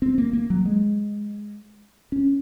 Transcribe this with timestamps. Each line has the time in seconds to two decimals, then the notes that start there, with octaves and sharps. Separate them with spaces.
0.02 C4
0.18 A#3
0.33 A#3
0.50 F#3
0.65 G#3
2.12 C#4